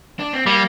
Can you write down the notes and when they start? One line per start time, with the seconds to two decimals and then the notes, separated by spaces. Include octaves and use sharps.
0.19 D4
0.33 C4
0.47 G3 A#3